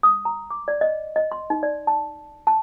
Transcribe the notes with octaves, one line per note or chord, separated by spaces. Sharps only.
D#6
A#5
D6
D5
D#5
D#5
C6
D#4
D5
A5
A5